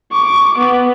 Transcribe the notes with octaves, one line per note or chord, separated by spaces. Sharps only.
C#6 D6
B3